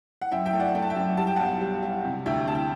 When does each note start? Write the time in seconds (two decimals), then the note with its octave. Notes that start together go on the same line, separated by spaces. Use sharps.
0.22 F#5
0.32 F#2 E5 G5
0.45 E5 G5
0.53 A3
0.60 D5 F#5
0.75 A3 G5
0.82 A5
0.90 E5 G5
0.96 F#2
1.17 G3 A5
1.27 G5
1.36 B1 F#5 A5
1.61 G3
1.82 G3
2.05 C3
2.26 D2 E5 G5
2.48 D2 A5
2.55 G5